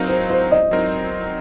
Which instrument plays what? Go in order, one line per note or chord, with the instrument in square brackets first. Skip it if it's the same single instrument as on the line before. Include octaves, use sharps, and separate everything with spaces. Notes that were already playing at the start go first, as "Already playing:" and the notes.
Already playing: [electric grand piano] F#3 C4 D#4 A#4 F5
[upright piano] C5
C5
D#5
[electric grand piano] F#3 C4 D#4 A#4